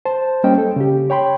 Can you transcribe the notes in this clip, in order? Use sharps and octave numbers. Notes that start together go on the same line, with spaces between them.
C5 A5
G3 A#3 C#4 C5 D#5 G5
A4
C#3 G4
C#5 G5 B5 C6